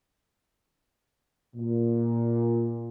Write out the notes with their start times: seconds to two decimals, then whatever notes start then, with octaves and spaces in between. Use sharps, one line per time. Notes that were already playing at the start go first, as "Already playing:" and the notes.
1.56 A#2